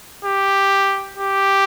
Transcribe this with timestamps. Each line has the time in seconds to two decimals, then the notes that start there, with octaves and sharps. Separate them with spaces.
0.24 G4
1.17 G4